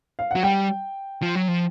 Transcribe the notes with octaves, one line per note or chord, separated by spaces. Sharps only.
F5
F#3 F#5
G3 G5
F3
F#3
F3